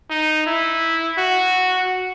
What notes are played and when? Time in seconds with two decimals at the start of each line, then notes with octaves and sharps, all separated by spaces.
0.10 D#4
0.46 E4
1.18 F#4